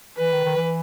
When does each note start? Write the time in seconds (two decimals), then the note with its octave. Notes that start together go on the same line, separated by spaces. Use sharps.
0.18 E3 B4
0.32 D#3
0.44 D#3
0.57 E3